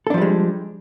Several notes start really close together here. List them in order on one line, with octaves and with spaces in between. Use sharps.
A4 D4 F3 G3 G#3